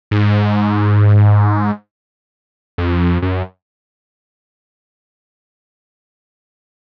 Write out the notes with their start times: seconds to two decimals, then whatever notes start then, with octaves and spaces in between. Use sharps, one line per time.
0.11 G#2
2.78 F2
3.22 F#2